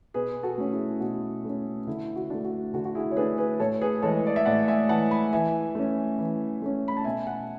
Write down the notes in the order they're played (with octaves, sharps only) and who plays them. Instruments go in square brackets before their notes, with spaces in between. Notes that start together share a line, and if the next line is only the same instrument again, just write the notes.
[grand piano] B2 G#4 B4
F#4 A4
A3 C#4
E4 G#4
B2 F#4
A3 C#4
D3 E4
F#4
A3 D4
F#4
D3 F#4
F#4
E4 G#4
C#5
A3 D4 G#4 B4
G#4 B4
A2 A4 C#5
G#4 B4
E3 G#3 A4 C#5
D5
E5
A2 D5 F#5
E5 G#5
E3 G#3 F#5 A5
G#5 B5
E3 E5 G#5
A3 C#4
E3
A3 C#4
B5
A5
B2 E5 G#5
F#5 A5